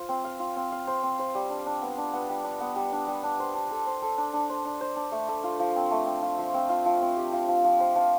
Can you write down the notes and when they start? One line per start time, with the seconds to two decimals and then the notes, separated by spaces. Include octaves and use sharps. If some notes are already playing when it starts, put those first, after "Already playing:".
Already playing: F4 C5
0.09 C4
0.24 F5
0.39 F4
0.56 C4
0.72 F5
0.87 C5
1.03 C4
1.19 C5
1.35 G3
1.50 D4
1.66 D4
1.82 B3
1.98 D4
2.13 B3
2.29 G3
2.44 D4
2.60 B3
2.76 G3
2.92 D4
3.07 G3
3.23 D4
3.40 C5
3.55 D4
3.71 A4
3.87 C5
4.02 A4
4.18 D4
4.33 D4
4.50 C5
4.65 D4
4.81 C5
4.96 D4
5.12 A3
5.28 A3
5.44 F4
5.60 F3
5.76 C4
5.91 A3
6.06 C4
6.22 F4
6.39 F3
6.54 C4
6.69 F4
6.86 F3
7.02 C4
7.17 G4
7.33 F3
7.48 F3
7.64 F3
7.80 C5
7.96 F3